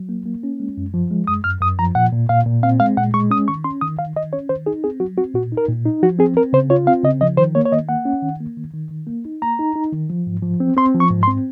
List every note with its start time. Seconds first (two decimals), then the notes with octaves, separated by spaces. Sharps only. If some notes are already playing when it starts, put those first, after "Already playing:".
Already playing: F#3
0.09 A#3
0.26 A#3
0.43 C#4
0.60 G#3
0.77 F#2
0.94 F3
1.11 G#3
1.27 F#2 D#6
1.44 F#2 F6
1.61 F#2 D#6
1.79 F3 A#5
1.95 A#2 F#5
2.13 A#2
2.29 A#2 F5
2.46 A#2
2.63 C4 F5
2.80 G#3 F5
2.97 A#2 F#5
3.14 G#3 C#6
3.31 C#4 D#6
3.48 D#3 C#6
3.64 C#4 C6
3.81 D#3 D#6
3.99 D#3 F5
4.16 D#3 D#5
4.33 C#4 C#5
4.49 D#3 C5
4.66 D#4 G#4
4.84 C4 G#4
5.00 F#3 F#4
5.18 C4 F#4
5.35 A#2 F#4
5.52 D#4
5.57 A#4
5.69 A#2
5.86 D#4
6.03 F3 F#4
6.19 C4 G#4
6.37 C4 A#4
6.53 C#3 C5
6.70 F4 C#5
6.87 C4 F5
7.04 C#3 D#5
7.21 F3 D#5
7.37 D#3 C5
7.55 A#3 C#5
7.65 C#5
7.72 D#3 D#5
7.89 A#3 F#5
8.05 C#4
8.22 D#3
8.40 A#3
8.57 D#3
8.74 D#3
8.91 D#3
9.07 A#3
9.25 D#4
9.42 A#3 A#5
9.59 D#4
9.75 D#4
9.92 D#3
10.10 F3
10.27 G#2
10.43 F3
10.60 C4
10.77 C4 C6
10.94 F3
11.00 C#6
11.10 G#2
11.23 C6
11.28 C4